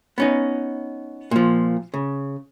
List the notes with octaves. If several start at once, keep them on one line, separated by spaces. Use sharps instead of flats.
B3 C#4 D#4
A#2 F3
C#3